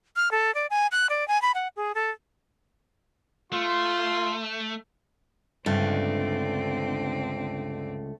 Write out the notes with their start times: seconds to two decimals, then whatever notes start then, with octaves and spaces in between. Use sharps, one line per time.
0.16 F6
0.31 A4
0.54 D5
0.70 G#5
0.91 F#6
1.10 D5
1.28 G#5
1.42 B5
1.54 F#5
1.76 G#4
1.95 A4
3.52 A3 F4 C6
5.66 C#2 G2 D3 A3 C4